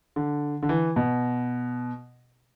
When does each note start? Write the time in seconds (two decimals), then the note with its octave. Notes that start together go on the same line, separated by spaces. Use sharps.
0.16 D3
0.63 D3
0.69 E3
0.96 B2